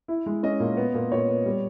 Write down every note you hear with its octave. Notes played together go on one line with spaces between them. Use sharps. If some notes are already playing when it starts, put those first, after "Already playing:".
E4
G#3
C#4 D#5
A#2
B3
A#2
A#2 C#5
B3
G3